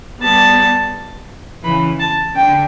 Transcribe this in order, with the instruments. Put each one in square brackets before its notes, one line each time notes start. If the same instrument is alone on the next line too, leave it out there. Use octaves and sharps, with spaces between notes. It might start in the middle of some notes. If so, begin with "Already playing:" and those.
[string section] G3 B3 [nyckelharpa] A5
[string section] C#3 E3 [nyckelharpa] B5
[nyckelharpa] A5
[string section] D3 [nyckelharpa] G5